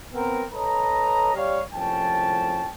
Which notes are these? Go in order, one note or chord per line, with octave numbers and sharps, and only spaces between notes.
B3 C4 A#4
A4 B4 C#5 D#5 A#5
G3 C#5 F5
C2 A2 F3 C#4 G5 A5